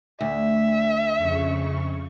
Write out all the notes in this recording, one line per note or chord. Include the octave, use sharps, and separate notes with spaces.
D2 E5
F2 C#3 C#6